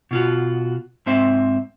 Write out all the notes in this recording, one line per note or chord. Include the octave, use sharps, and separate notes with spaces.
B2 F4 F#4
G#2 C4 E5